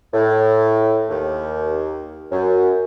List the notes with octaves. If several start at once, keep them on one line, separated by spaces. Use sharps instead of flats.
A2
D#2
F#2